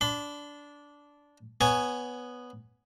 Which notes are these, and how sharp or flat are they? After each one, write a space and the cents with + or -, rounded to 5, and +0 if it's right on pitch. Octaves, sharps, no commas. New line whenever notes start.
D4 -15 B5 +35
B3 +0 C#5 +20 G#5 +0